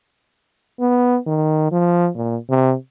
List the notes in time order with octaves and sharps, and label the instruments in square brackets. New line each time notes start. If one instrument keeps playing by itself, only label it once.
[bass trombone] B3
D#3
F3
A#2
C3